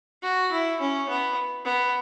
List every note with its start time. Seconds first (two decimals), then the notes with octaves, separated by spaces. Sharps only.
0.23 F#4
0.52 E4
0.80 C#4
1.09 B3
1.65 B3